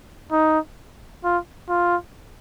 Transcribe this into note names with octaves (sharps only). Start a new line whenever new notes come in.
D#4
F4
F4